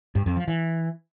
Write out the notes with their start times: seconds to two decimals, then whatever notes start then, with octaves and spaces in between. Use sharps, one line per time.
0.15 G2
0.26 F2
0.37 F3
0.48 E3